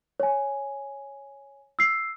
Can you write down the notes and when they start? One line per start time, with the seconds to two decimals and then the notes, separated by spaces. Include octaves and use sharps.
0.20 C#5 G#5
1.79 E6 C7